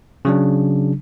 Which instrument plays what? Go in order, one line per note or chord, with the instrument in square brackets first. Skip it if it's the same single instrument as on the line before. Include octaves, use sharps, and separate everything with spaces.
[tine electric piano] C#3 F#3 D4